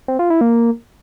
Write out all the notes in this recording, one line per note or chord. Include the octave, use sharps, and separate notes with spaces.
C4
F4
E4
A#3